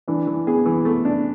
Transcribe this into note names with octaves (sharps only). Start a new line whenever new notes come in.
E3 D4
E3
B3 G#4
E3
A3 B3
D4